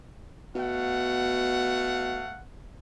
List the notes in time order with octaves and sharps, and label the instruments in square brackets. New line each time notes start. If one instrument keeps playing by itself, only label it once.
[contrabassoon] B2 [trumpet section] A3 F5 F#5